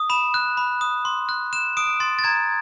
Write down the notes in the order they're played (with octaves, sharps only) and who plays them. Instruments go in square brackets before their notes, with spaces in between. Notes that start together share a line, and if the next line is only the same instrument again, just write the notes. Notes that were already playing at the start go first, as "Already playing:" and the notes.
Already playing: [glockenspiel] D#6
B5 E7
F#6
B5
D#6
C6
F#6
F#6 E7
D#6 D7
C6 A6
A6
A#5 G#6